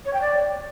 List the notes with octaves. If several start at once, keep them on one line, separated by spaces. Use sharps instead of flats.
C#5
G5
D5